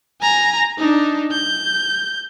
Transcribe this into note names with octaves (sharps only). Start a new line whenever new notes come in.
G#5 A#5
D4 D#4
G6